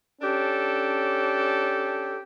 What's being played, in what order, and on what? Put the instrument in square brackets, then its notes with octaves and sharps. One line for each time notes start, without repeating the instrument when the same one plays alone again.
[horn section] C#4 D4 G4 A4